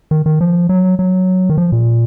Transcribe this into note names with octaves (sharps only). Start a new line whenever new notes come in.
D#3
D#3
F3
F#3
F#3
D#3
F3
A#2